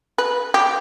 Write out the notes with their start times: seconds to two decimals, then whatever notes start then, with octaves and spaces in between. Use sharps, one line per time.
0.18 B4
0.54 G4